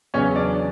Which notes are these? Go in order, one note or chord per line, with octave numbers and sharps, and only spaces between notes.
E2 C#3 F#3 B3 C#4 C#5
D4 D5